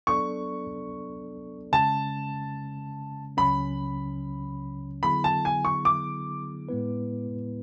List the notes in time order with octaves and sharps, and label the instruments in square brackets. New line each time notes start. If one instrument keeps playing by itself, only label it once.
[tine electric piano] F#3 B3 D4 A4 D5 [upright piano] C#6
[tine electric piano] C#3 G#3 C#4 [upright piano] A5
[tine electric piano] C#2 C#3 F#3 C#4 [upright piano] B5
[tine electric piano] D3 F#3 B3 E4 G#4 [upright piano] B5
[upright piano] A5
G#5
C#6
D6
[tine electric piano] A2 G#3 B3 E4 B4